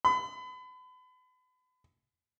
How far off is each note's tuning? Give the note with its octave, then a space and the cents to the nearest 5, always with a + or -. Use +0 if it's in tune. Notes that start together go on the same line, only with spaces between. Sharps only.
B5 +35